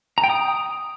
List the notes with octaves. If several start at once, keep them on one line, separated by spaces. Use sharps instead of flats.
A#5
G5
D#6